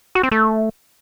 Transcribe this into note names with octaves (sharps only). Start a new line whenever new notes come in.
F#4
C4
A3